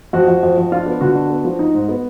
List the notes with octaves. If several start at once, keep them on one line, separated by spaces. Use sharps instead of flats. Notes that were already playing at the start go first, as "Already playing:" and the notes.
F2 F#4
F2
F2
F2
D4 F4
B3
D3 F#4
D4
B3
F3
D#4
G#2
B3